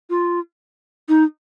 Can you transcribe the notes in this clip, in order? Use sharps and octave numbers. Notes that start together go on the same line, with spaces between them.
F4
D#4